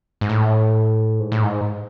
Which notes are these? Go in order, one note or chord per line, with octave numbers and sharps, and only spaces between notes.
G#2
A2
G#2
A2
G#2